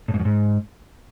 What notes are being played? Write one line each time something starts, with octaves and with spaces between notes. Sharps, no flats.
A2
G#2
F#2
G#2